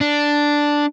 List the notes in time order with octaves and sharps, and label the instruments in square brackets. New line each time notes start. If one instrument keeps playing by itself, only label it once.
[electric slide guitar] D4